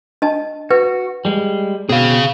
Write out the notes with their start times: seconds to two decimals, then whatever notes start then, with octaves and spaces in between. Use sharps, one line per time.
0.22 D4 D#5 A5
0.71 F#4 B4
1.25 G3 G#3
1.89 B2 C4 G#4 F5